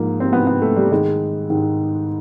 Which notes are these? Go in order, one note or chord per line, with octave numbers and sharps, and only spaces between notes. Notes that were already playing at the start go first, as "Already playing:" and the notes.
Already playing: G#2 F3 A#3
C4
G#2 F3 B3
B3
A3
G3
G#2 D#3 G#3
G#2 D#3